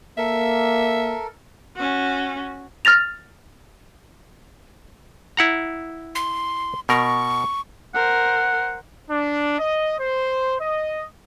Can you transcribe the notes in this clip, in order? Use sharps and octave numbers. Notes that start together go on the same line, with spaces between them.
A#3 A4 A#4 E5
C#4 F#4
F6 A6 A#6 F7
E4 F#5 A#5
C6
B2 A#4 C#6
A#4 C5 F#5
D4
D#5
C5
D#5